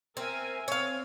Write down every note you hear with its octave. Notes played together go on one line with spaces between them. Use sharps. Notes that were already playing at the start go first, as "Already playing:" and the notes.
C4 A#4 E5 G#5
C4 C#5 F5